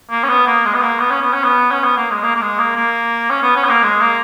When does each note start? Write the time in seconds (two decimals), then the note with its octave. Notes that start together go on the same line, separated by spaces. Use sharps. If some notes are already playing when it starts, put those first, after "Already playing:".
0.11 A#3
0.23 C#4
0.29 B3
0.47 A#3
0.65 G#3
0.74 B3
0.82 A#3
0.99 B3
1.11 C#4
1.21 B3
1.34 C#4
1.44 B3
1.71 C#4
1.84 B3
1.97 A#3
2.11 G#3
2.23 A#3
2.35 A#3
2.41 G#3
2.59 A#3
2.76 A#3
3.30 C#4
3.42 B3
3.56 C#4
3.64 B3
3.69 A#3
3.83 G#3
4.01 A#3